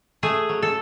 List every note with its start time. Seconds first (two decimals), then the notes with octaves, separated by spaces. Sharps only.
0.23 A3 G#4
0.49 F#3
0.62 A4